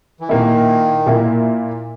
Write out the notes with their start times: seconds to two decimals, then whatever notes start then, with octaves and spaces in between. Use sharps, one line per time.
0.20 E3
0.29 A#2 D#3 A#3 E4
1.06 A#2 A#3 E4